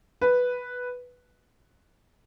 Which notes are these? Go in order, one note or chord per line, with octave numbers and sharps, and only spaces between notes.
B4